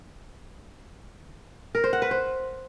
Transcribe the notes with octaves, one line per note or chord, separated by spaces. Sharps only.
A#4
C5
F#5
B4
C5